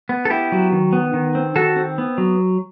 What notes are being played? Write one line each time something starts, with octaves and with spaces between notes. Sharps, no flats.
B3
A4
B3 E4 G4
F#3
D#3
B3
D#3
C4
D#3 F#4 A4
C4
B3
F#3